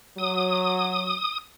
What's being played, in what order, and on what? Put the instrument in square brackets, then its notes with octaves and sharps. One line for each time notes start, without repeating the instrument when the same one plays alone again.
[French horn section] F#3 [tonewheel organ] D#6